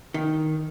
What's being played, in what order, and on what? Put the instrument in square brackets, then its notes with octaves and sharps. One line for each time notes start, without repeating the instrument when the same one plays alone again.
[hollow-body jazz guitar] D#3